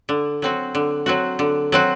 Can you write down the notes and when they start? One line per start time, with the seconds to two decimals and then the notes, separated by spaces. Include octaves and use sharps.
0.09 D3
0.42 F#3 C4 F#4
0.75 D3
1.06 F#3 C4 F#4
1.39 D3
1.72 F#3 C4 F#4